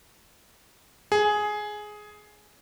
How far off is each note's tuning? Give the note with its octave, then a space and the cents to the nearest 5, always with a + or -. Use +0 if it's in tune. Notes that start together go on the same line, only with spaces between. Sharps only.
G#4 +10